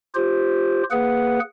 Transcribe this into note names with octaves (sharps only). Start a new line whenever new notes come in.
F4 G4 C5
A#3 G#4 B4 F#5